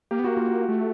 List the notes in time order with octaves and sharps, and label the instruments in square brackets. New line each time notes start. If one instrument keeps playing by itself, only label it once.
[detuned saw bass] A#3 [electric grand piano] G4
[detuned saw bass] B3
[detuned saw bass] A#3 [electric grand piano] F#4
[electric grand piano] F4
F#4
[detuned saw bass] A3